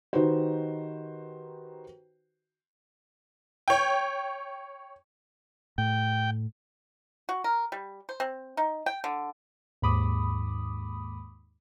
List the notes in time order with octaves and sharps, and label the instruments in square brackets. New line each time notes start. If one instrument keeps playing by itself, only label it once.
[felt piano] D#3 D#4 F#4 G4 B4 C5
[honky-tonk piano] C#5 G5
[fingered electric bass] A2 [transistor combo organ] G5
[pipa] F#4
A#4
G3
C5
C4
D#4
G5
D3
[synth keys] D#2 G#2 B5 D6 D#6